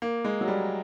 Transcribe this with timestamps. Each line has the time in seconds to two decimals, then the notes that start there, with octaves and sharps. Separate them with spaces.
0.02 A#3
0.25 G#3
0.41 F#3
0.48 G3